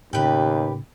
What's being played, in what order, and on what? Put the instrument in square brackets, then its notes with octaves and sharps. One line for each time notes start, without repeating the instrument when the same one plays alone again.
[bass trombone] D#2 [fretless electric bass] A2 C#3 [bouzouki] G4 B4